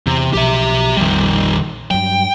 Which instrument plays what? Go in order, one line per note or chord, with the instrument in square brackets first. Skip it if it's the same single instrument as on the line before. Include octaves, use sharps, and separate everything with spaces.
[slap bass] E2 [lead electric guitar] C3
[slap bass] B1 B2 F3 [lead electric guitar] G4 E5
[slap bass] A#1 F2 [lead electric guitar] D#3 G3
[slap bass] G2 F#3 [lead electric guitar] G5